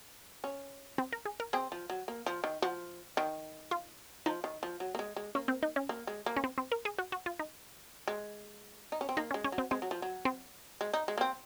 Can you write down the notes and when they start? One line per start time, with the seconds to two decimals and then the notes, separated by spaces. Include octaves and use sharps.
0.44 C#4
0.98 C4
1.13 A#4
1.26 G#4
1.40 A#4
1.53 C4 G#4
1.72 F3
1.90 F#3
2.08 A#3
2.26 F3
2.44 D#3
2.62 F3 F#4
3.17 D#3
3.71 F4
4.26 F3 D#4
4.44 D#3
4.63 F3
4.80 F#3
4.95 A#3
4.99 G#3
5.16 G#3
5.35 A#3 C#4
5.48 C4
5.63 D#4
5.76 C#4
5.89 A#3
6.07 G#3
6.26 A#3
6.36 C#4
6.44 C4
6.58 C4
6.72 A#4
6.85 G#4
6.99 F#4
7.12 F#4
7.26 F4
7.39 D#4
8.08 G#3
8.92 D#4
9.01 C#4
9.09 C4
9.17 A#3 D#4
9.31 C#4
9.34 G#3
9.44 C#4
9.52 F#3
9.58 C4
9.71 G#3 C4
9.82 F#3
9.91 F3
10.02 F#3
10.25 C4
10.81 G#3
10.93 D#4
11.08 G#3
11.18 A#3
11.21 C4